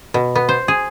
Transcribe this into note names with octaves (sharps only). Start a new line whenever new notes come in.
B2
B3
C5
G#4